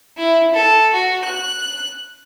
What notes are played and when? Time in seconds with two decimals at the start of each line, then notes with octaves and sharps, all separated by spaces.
0.17 E4
0.54 A4
0.94 F#4
1.25 F#6